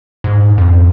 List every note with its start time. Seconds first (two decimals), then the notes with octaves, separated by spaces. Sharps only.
0.24 G#2
0.58 F2